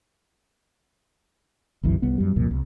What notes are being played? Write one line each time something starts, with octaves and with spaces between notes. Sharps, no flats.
G1 C2 F#2 E3
C2 B3
F#2 G3
C2 F2 A#2
C2